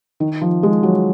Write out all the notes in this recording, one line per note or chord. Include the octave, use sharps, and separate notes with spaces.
D#3
F3
G#3
F#3